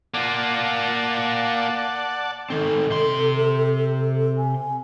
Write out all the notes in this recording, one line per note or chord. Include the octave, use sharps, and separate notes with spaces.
A#3 F4 D5 F#5 A5
D#3 C4 A4
C3 C6
G#5